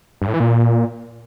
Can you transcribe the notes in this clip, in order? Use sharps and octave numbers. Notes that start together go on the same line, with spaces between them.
G2
A2
E3
A#2